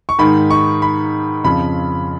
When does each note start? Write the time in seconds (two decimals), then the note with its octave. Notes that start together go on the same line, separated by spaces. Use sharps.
0.09 C#6
0.19 G#2 D#3 B5
0.51 C#6
0.82 B5
1.44 F2 C#3 F3 B5